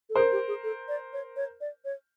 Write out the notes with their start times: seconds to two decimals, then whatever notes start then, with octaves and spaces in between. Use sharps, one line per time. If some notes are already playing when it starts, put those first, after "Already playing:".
0.10 A4
0.15 G#4 A#4 C5
0.32 G4
0.48 G#4
0.64 A4
0.88 D5
1.13 C#5
1.36 C#5
1.61 D5
1.85 C#5